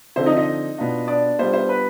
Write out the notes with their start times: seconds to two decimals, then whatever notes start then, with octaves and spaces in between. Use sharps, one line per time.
0.16 D3 F3 C4 C5
0.26 D#4 D#5
0.36 D#4 D#5
0.78 B2 B3 D4 F4
1.08 D4 D5
1.39 G3 B3 D4 F4 C5
1.53 C5
1.69 B4